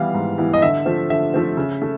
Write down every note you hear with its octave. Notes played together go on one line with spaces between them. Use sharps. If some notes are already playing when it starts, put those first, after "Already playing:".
Already playing: E3 G3 B3 E4 F5
G#2
E3 G3 B3 E4
D#5
D3 E5
F3 A3 C4
D3 E5
F3 A3 C4
C#3
A3